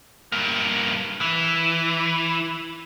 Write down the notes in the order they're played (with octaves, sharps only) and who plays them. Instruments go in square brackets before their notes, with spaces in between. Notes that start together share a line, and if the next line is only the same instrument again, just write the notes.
[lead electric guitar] G2 A#3
E3